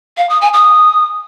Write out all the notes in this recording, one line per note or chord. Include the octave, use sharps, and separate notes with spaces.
F5
D#6
G#5
D#6